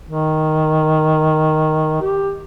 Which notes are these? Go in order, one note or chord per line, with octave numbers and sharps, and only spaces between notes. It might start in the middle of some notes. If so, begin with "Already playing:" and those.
D#3
G4